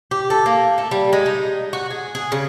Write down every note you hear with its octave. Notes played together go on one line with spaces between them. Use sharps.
G4
A4
A#3
A3
G3
G#3
D#4
F#4
G#4
G#4
C#3